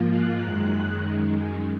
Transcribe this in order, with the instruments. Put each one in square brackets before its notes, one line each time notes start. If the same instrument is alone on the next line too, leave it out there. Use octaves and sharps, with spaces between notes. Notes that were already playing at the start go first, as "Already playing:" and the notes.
Already playing: [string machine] G#2 F3 A#3 F4
F#6
F#2 D#3 G#3